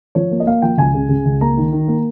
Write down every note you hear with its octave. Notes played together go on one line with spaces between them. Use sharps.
F3 C#5
A#3
D#5
A#3 F5
F3 G5
C#2 G#5
C#3
C#3
C#2
A#3 A#5
D#3
D#3
A#3